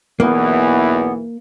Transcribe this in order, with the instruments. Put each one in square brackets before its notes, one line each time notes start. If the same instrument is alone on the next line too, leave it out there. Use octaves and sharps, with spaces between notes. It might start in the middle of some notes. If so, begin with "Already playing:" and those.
[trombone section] B1 E2 E3 [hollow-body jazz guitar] A#3 [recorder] B3